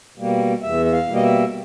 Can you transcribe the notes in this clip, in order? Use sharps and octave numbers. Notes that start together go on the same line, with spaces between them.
B2 G3 A#3
E2 E5
E5
F5
B2 G3 A#3
D#5
E5